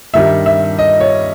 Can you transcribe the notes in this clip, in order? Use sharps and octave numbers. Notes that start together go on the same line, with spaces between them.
G2 D#3 G3 E5
E5
D#5
C#5